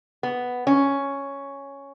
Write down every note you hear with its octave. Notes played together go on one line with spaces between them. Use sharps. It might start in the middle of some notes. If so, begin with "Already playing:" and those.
B3
C#4